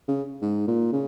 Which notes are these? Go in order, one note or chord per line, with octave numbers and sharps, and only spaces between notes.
C#3
G#2
A#2
C#3